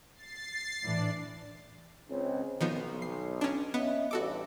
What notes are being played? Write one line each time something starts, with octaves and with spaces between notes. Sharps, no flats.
A6 C7
A2 E3 D4 D5
C#2 C4 C#4
B1 D#3 F3 B3
C7
C#4 D4
B3 C#4 D#5 E5
A1 G2 F#4 A4 D6